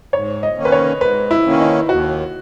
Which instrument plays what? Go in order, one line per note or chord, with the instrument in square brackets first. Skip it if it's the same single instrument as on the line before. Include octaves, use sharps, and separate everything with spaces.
[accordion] G#2 [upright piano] C#5
[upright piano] D#5
[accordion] D#3 A#3 C#4
[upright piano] B4
C#5
[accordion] G#2 [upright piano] B4
[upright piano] E4
[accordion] D#3 A#3 C#4
[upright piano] D#4
[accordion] D#2 [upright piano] F#4